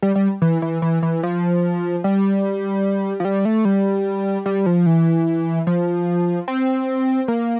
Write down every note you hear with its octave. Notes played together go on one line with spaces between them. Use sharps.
G3
G3
E3
E3
E3
E3
F3
G3
F3
G3
A3
G3
G3
F3
E3
F3
C4
A#3